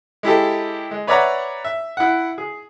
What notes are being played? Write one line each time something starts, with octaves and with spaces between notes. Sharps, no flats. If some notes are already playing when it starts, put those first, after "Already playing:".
G#3 E4 G4 A4
G#3
B4 C#5 D5 E5 F#5 A#5
E5
E4 F#5
G#4